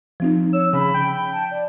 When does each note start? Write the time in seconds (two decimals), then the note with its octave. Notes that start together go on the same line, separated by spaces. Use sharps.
0.20 F3 C4 D#4
0.53 C#5 E6
0.73 C#3 B5
0.94 G5
1.33 A5
1.51 D5